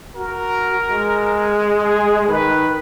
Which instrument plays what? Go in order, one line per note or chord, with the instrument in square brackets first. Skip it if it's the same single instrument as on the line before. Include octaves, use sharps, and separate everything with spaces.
[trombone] F#4 [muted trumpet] A#4
[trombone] G#3
[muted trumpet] G#4
[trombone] D#3 [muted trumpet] B4